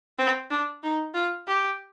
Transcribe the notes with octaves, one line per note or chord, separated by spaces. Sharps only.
C4
D4
D#4
F4
G4